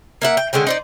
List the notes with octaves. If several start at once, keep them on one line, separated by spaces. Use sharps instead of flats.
A#3 E5 F#5
G5
D3 G#3 C#4 G5
D#4 C5 D5